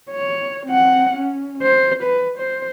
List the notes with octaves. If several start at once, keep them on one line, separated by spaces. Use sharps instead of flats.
C#5
C4 F#5
C#4
C5
B4
C5